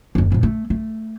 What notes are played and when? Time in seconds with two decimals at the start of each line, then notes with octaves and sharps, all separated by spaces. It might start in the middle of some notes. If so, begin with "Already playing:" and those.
0.15 F#1 D#2
0.32 F2 A2
0.43 A3
0.70 A3